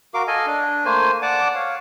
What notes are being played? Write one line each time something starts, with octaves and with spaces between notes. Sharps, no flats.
F#4 A#4 F5 D6
A4 D#5 F5 G#5
D4
A3 A#3 C5 G#5
D5 F#5 A5 D6
C#5 F5